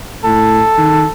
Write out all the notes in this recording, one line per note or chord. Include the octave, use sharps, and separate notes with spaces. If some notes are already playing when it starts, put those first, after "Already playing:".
A2 A4
D#3